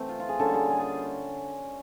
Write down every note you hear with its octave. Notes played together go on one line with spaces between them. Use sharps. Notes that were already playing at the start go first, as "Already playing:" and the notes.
Already playing: E3 A3 C4
F4
F4
G#4
D3 G3 A#3 C#4 A4
G#4
G#4
G#4